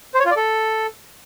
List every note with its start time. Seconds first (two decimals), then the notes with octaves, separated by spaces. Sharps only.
0.14 C5
0.20 C#5
0.25 F4
0.31 D5
0.36 A4